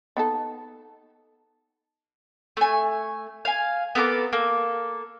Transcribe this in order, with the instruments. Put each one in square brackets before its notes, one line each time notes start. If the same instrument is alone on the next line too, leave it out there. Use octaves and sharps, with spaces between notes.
[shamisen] B3 D#4 A4
[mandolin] A3 G#5
F5 G#5
B3 A4 A#4 D6
A#3 A4